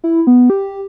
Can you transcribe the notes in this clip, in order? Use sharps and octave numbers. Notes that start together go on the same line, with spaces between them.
E4
B3
G4